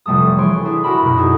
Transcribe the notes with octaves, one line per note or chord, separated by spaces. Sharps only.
F1 G3 A3 A4 D#6
E3 G#4 C#5 C6 D7
D4 E4 G#4
F#4 G4 A#4 A5 B5
F#2 B2
D#4 G#4 A4